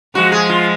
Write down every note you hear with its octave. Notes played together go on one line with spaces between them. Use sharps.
F3 G#3 F#4
G#4
F4